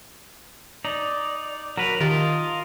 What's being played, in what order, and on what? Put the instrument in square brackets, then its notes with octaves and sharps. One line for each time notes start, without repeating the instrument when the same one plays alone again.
[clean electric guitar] D#4 [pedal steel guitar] D5
[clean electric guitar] F#3 B4 [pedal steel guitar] A#4
[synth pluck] D#3 G4 A5 [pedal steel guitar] F4 D#5 [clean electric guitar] A#4